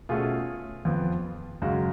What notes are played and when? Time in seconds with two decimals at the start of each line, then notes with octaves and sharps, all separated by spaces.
0.09 B2 A3 C#4 F4 G#4
0.85 F2 F3 B3
1.62 F#2 C#3 G#3 F#4